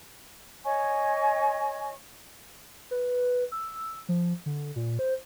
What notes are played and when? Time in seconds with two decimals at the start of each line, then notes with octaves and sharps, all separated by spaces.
0.64 C#5 D#5 G#5 C#6
2.91 B4
3.52 E6
4.09 F3
4.46 D3
4.76 A#2
4.99 C5